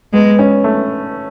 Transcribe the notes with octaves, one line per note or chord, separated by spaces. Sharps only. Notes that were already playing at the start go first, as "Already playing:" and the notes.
G#3 B3
C#4
A3